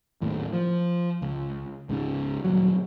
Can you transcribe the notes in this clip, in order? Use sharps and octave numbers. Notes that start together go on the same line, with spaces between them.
G#1 D#2 A2
F3
C#2
C#2 G#2 C#3
D#1 C#2 F#3